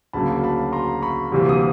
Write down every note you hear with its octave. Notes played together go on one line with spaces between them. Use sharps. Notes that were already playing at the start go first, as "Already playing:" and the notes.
D2 C#3 F#3 A#3 A5 B5
A5 B5
A#5 C6
B5 C#6
D2 C3 E3 G3 A#3
D#6